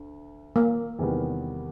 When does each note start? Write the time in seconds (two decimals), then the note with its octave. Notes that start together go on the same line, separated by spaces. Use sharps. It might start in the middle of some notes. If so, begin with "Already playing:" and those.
Already playing: D2 D3
0.56 A#3
0.99 E2 C3 D#3 G3 B3